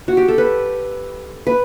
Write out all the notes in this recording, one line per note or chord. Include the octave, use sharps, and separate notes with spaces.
F#4
G4
A4
B4
B4